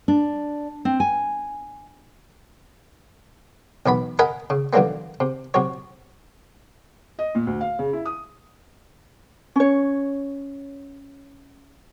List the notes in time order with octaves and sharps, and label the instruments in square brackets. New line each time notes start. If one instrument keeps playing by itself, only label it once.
[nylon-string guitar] D4
C4
G#5
[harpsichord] B1 E3 B3 B5
A#4 D#5 F#5 G#5 B5
C#3
D3 E3 F#3 G3 A#3 B3
C3
C3 F#3 C#5
[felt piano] D#5
A#2
D2
F5
C#3
E4
D#6
[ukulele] C#4 C#5